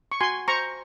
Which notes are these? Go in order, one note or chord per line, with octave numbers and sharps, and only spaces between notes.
C#6
F#4 G#5 C6
C5 A#5 C#6